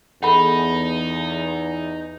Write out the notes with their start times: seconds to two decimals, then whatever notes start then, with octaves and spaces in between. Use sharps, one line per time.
0.23 E2 D#4 G#4 A4 F#5 B5